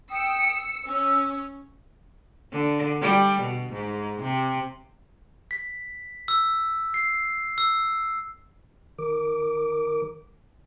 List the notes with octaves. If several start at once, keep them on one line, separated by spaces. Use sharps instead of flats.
G5 D#6 E6 C#7
C#4 E6
D3
G3
B2
G#2
C3
B6
E6
C7
E6
D#3 A#4 D6